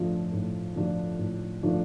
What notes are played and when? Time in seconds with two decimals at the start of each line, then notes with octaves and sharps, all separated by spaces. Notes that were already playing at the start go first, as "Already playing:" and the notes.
Already playing: A2 F3 A3 D4 F4
0.32 A2
0.76 F3 A3 D4 F4
1.19 A2
1.63 F3 A3 D4 F4